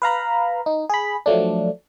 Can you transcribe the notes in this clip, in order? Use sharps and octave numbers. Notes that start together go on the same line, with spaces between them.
B4 F5 A#5 B5
D#4
G#4 B5
F3 F#3 A3 D4